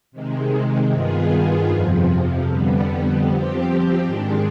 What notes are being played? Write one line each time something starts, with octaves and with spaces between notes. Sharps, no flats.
C3 D#3 G#3
G2 D#3 B3 F4 G#4
F2 C3 F3
F2 D3 G3 B3
F3 C4 G4
G#2 D#3 G#3 D4